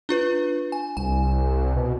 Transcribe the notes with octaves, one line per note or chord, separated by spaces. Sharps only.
D4 F4 B4
G#5
C2 G#5
B2